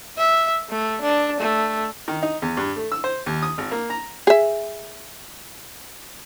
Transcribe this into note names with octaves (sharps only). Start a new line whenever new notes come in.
E5
A3
D4
A3
D#3
D#4
E2
G2
A3
E6
C5
D#2
D#6
G#1
A#3
A#5
G#4 E5